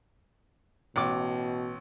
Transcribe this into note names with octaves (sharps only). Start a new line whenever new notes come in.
A1 B2 D6